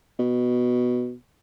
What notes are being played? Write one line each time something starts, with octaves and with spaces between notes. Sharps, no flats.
B2